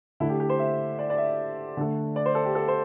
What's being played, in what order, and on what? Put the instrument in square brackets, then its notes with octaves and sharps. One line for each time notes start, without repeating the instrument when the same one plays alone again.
[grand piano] D3 A3 E4
G4
G4
C5
E5
D5
D5
E5
D3 A3
D5
C5
A4
G4
A4
C5